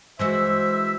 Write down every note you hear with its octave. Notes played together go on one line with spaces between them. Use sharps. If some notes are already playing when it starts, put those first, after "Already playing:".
E3 G#3 F#4 C5 E5 E6